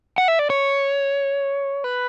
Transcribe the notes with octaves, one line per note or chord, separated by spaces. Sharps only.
F#5
E5
D5
C#5
B4